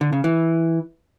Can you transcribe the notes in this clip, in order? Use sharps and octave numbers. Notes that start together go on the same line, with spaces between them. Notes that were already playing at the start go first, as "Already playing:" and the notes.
D3
C#3
E3